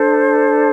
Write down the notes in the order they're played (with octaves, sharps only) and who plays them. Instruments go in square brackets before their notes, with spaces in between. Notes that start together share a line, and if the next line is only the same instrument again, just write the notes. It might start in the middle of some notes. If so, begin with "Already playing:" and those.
Already playing: [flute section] D4 A4 C5